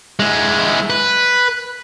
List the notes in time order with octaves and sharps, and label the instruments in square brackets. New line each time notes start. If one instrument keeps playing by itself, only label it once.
[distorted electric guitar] G#3 E4
B4